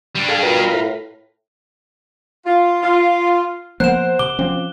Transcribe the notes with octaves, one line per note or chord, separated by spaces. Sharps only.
G3 D4
G#4 A4 F5
B2 F4 A#4 B4
A2
F4
F4
F3 A#3 B3 A#4 C5 F#5 F#6 E7
C3 D6 G7
F3 C4 C#4